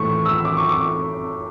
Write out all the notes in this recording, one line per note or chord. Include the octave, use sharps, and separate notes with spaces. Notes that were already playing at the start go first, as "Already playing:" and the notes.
Already playing: A2 E3 A3 E4 C#6
E6
D6
C#6
D6